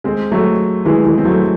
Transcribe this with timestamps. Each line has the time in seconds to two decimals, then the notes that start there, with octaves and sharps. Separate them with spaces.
0.04 G#3 C4
0.32 F#3 A3
0.85 E3 G#3
1.05 E3 G#3
1.18 C4
1.25 F#3 A3